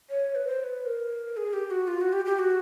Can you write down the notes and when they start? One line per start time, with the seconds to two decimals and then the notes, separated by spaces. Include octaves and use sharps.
0.10 C#5
0.35 B4
0.47 C5
0.60 C5
0.64 B4
0.86 A#4
1.37 G#4
1.53 G4
1.71 F#4
1.88 F4
2.01 F#4
2.13 G4
2.26 G4
2.39 F#4